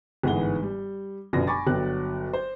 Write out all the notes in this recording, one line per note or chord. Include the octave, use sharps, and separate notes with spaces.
G1 G#2 E3 G#4 F#5 G7
G3
G1 F#2 B2 F3 D5 A#6
G#5 B5 C#6 D6 A6
G1 F#3 G5 F#6
C5